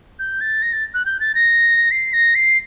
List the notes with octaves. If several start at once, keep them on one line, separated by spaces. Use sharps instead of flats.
G6
A6
A#6
A6
F#6
G6
A6
A#6
C7
A#6
C7